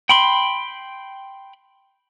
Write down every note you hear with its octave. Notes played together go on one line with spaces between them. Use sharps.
G5 B5 C6